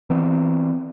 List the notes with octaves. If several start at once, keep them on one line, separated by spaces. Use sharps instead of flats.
E3 B3 C4